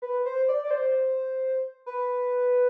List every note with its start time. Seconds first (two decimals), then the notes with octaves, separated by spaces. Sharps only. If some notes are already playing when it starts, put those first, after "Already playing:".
0.02 B4
0.25 C5
0.48 D5
0.64 D5
0.71 C5
1.86 B4